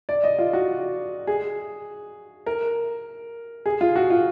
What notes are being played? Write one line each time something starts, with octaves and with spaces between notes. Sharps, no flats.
D5
D#5
F4
F#4
G#4
A#4
G#4
F4
F#4
F4